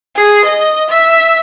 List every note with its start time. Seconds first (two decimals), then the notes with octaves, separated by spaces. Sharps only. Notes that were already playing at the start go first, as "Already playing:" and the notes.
0.16 G#4
0.45 D#5
0.90 E5